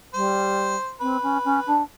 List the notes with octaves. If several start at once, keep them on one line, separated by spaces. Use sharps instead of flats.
G3 C5
C4 B4
C#4
C#4
D4